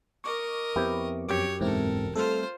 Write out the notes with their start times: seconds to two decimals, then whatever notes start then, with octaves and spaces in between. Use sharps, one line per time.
0.24 A#4 D#5 C#6 D6
0.76 F2 B3 C4 E4 G4
1.29 F#2 G4 C#5 D6
1.61 E1 E2 G#2 C4 E4 A4 A#4
2.16 G3 A3 C4 F4 A4 C5 F6